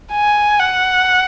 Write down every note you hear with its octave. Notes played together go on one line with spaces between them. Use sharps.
G#5
F#5